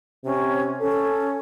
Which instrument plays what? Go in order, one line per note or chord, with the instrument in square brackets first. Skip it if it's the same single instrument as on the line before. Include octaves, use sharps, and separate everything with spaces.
[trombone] C3 [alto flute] C#4
[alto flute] C#4 [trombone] A4